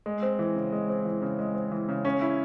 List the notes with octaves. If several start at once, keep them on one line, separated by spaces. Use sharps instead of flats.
G#3
C4
E3
C#3
G#3
C4
E3
C#3
G#3
C4
E3
C#3
C#4
E4